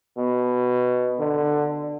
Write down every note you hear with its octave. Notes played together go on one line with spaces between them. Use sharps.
B2
D3